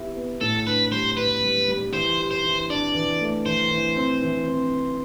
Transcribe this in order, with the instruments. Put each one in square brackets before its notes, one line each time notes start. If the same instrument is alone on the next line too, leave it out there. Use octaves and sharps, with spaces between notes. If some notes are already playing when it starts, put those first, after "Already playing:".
Already playing: [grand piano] B3 E4 G4
B3
[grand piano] A2 [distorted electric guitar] A4
[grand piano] D4 [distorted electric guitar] B4
[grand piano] G3 [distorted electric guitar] C5
[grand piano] D4 [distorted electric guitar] B4
[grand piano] G3
G3
[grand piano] E3 [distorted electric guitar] C5
[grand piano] G4
[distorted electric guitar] C5
[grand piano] E3
[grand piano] D4 [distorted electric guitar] D5
[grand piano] E3
A3
[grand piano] E3 [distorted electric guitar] C5
[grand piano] E3
C4
E3
C4